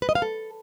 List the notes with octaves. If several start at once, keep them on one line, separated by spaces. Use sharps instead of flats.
B4
D#5
F5
A4